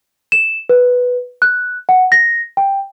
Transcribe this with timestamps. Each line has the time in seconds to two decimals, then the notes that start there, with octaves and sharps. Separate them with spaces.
0.32 E7
0.70 B4
1.42 F#6
1.89 F#5
2.12 A#6
2.57 G5